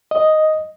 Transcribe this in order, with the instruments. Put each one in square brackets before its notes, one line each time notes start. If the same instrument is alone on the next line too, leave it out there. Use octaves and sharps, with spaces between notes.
[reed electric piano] D#5